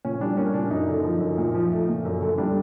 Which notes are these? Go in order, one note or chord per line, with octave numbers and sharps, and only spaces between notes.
A#2 C#4
G3 D4
A#3 C#4
A#2 D4
F#2 D#4
D3
F3
F#2
A#2
F3
A3
A#2
F#2
D3
G3 D4